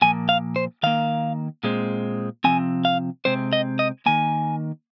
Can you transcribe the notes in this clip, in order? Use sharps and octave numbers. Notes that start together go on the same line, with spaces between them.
A#2 F3 A#3 G#5
F5
C5
D#3 A#3 F5
A#2 G#3 C4
C3 F3 C4 G#5
F5
C3 G#3 C4 C5
D#5
D#5
D#3 A#3 G#5